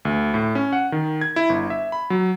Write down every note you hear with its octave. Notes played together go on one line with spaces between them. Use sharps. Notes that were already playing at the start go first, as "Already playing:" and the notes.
D2
A2
C#4
F#5
D#3
G#6
E4
G1
E5
B5
F#3